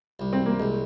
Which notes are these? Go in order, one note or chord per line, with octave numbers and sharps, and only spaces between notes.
C2
C4
A#3
C2 G#3